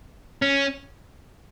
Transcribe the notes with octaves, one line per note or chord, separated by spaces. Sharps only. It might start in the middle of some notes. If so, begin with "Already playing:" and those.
C#4